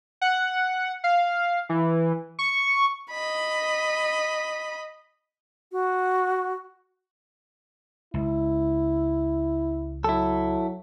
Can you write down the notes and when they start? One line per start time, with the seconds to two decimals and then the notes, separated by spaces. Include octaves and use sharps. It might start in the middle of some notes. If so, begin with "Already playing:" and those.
0.21 F#5
1.04 F5
1.69 E3
2.39 C#6
3.11 D#5 B5
5.72 F#4
8.14 C#2 E4
10.04 F#3 E4 A4